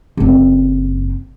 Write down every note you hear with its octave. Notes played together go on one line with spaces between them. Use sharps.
F#1 C4